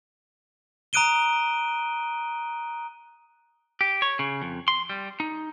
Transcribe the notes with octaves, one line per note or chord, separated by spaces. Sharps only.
A#5 D#6 F#6 D7 D#7 G7
G4
C#5
C#3
F2
C6
G3
D#4